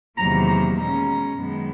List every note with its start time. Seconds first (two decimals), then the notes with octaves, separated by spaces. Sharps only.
0.18 E2 C3 D#3 F#3 A#3 A#5
0.49 A#5
0.78 B2 G#3 C#4 A#5
1.39 F#2 D#3 G#3 B3